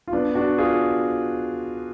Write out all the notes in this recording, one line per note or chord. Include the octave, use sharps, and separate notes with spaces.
F4
B3 D4
D4 F#4
F4 G#4